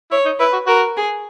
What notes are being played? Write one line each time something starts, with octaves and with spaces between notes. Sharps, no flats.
E4 C#5
D#4
E4 B4
F#4
F#4 A#4
G#4